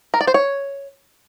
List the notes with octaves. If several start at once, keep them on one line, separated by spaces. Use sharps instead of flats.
A#4
D5
C5
C#5